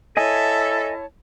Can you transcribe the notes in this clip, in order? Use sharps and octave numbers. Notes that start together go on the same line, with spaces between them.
E4 A4 C#5 D#5 E5 G#5 A5